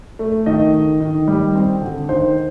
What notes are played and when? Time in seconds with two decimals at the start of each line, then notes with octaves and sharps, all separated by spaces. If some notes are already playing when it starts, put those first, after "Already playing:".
0.19 A3
0.46 D#3 D#5
0.73 D#3
1.01 D#3
1.28 G3
1.55 C4
1.82 D3
2.09 D#3 C5